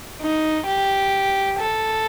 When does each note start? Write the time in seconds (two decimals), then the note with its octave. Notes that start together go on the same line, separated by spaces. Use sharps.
0.21 D#4
0.66 G4
1.59 A4